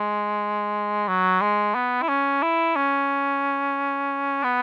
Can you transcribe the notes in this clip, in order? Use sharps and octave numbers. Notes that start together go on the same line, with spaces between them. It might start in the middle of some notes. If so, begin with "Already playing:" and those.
Already playing: G#3
F#3
G#3
B3
E4
C#4
E4
C#4
B3